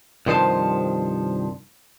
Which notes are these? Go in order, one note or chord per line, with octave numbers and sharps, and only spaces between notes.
C2 G2 D#3 F3 C5 A5